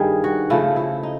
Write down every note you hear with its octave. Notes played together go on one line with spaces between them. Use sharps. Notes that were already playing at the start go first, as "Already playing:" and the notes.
Already playing: G2 D#3 G3 G#4
F#4
C#3 F3 A3 E4
E4
D#4